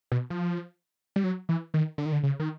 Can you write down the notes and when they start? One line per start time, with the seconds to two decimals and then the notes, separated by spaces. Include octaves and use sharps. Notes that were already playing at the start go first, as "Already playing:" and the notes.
0.12 B2
0.30 F3
1.16 G3
1.24 F#3
1.49 E3
1.74 D#3
1.98 D3
2.06 D#3
2.12 D3
2.23 C#3
2.40 D#3